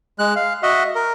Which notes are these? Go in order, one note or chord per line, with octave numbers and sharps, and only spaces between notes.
G#3 F#6
F5
F#4 D#5 E5 F#5
A#4